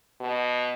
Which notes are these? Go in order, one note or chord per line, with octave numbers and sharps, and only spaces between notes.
B2